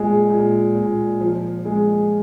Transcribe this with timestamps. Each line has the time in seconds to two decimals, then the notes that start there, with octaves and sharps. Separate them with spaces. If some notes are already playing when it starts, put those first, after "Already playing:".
Already playing: A#2 G#3
0.30 A#2
0.75 A#2
1.20 F3
1.65 G#3